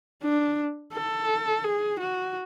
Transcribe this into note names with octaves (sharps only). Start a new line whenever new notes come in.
D4
A4
G#4
F#4